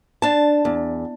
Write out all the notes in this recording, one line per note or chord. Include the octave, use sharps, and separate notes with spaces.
D4 A5
E2